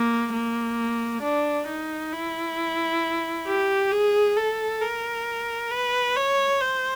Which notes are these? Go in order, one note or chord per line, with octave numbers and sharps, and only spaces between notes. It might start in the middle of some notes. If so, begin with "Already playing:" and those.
Already playing: A#3
A#3
D4
D#4
E4
G4
G#4
A4
A#4
B4
C#5
C5